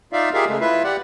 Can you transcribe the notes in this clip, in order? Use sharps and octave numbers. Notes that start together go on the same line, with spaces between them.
D#4 F4 D5 E5 F5
F4 G4 G#4 A#4 E5 F5
C#3 G#3 A3
E4 F4 B4 E5
G4 D5 F#5